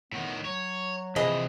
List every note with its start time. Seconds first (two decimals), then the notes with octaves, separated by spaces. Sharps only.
0.12 A2 D#3 B3
0.45 F#3 C#5
1.16 C3 E3 F3 G#4 B4 D#5